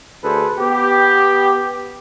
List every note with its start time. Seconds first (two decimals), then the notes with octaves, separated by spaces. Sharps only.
0.22 D2 G#4 A4 B4 C5
0.59 B3 G4